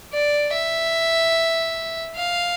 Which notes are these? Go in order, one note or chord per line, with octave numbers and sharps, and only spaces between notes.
D5
E5
F5